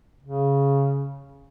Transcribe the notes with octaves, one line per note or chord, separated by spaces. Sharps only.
C#3